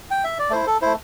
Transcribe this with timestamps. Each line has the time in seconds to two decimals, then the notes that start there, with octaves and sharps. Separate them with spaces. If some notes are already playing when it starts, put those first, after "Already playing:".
0.11 G5
0.24 E5
0.39 D5
0.50 A3 E4 C5
0.67 A4
0.82 A3 E4 C5